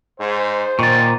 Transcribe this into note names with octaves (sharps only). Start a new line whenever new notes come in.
G#2 C5
A#2 D#3 C#6 A6